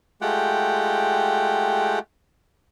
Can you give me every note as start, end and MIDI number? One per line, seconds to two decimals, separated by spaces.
0.21 1.99 56
0.21 1.99 57
0.21 1.99 65
0.21 1.99 67
0.21 1.99 78
0.21 1.99 79